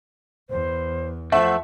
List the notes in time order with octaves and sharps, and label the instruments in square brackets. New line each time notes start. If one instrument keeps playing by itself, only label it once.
[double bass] E2 [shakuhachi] C5
[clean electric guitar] F3 A3 [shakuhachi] C5 [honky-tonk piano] E5 F#5